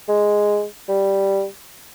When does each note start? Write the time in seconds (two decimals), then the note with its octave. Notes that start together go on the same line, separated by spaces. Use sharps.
0.09 G#3
0.88 G3